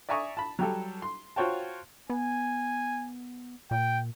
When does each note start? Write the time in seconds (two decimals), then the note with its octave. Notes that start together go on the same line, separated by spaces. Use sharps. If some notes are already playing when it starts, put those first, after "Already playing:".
0.09 D5 E5 G#5 A#5 C#6 D#6
0.37 A5 B5
0.59 F#3 G3 G4 A4
1.02 C6
1.36 F4 F#4 C5 C#5 G5 A5
2.09 B3 G#5
3.71 A#2 G5